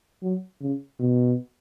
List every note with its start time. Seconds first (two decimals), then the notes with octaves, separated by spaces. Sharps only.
0.22 F#3
0.61 C#3
0.99 B2